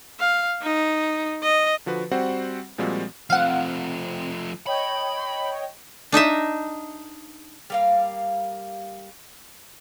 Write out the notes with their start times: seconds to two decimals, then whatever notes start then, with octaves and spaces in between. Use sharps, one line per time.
0.20 F5
0.62 D#4
1.42 D#5
1.86 D3 F3 F#4 B4
2.11 G3 C4 F#4 C5 F#5
2.78 A#2 F3 G3 G#3 C4 F#4
3.30 F3 A3 C4 F5 F#5
4.67 C#5 D#5 G5 B5
6.12 D4 D#4 D#5 E5
7.70 G3 A#3 F5